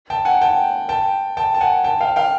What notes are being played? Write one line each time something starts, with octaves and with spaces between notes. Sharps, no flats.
G5 A5
F#5 G#5
G5 A5
G5 A5
G5 A5
A5
F#5 G#5
G5 A5
F5 G5
F5 G5